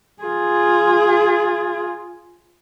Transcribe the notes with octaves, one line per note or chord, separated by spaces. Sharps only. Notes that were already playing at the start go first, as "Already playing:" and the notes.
F4 G#4